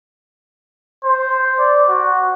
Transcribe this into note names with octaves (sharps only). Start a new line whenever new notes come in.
C5
D5
F#4